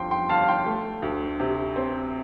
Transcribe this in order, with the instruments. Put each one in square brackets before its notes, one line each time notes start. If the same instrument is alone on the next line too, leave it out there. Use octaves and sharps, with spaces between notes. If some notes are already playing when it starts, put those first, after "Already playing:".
Already playing: [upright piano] G1 F2 D3 G5 C6
G5 C6
G1 F5 A5
G5 C6
A3
D2
C3
C4